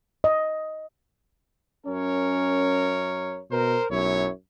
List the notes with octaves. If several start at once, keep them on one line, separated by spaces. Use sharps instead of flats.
D#5
F#2 C#4 A#4 C#5
B2 A#4 C5
B1 F#2 E4 C#5